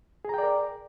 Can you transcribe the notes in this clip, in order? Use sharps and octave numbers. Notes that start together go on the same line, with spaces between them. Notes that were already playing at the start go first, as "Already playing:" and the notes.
G#4 A#4 D5 G5 A#5